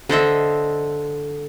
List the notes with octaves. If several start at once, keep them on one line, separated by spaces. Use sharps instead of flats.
D3 C5 D#5 E5